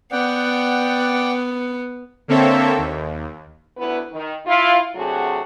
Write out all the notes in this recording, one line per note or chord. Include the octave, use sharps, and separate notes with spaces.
B3 D5 F#5 G5
D3 A#3 C4 A4 C#5 E5
D#2
D2 B3 E4 B4
D#3
E4 F4
C3 F#3 A3 D4 F#4 G#4